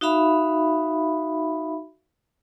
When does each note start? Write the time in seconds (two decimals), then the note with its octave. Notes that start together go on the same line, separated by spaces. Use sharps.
0.01 D#4 F#4 E5 F5 B5